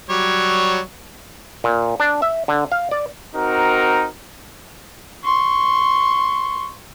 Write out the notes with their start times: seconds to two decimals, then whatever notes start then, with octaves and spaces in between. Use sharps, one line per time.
0.09 F#3 G3 C#5
1.64 A#2
2.00 D4
2.22 E5
2.48 D3
2.72 F5
2.91 D5
3.35 C4 D#4 F#4 A#4
5.24 C6 C#6